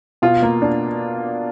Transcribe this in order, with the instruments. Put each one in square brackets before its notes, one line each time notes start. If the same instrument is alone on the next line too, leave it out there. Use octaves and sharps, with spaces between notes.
[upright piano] B2 [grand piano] F4
[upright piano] A#3
D4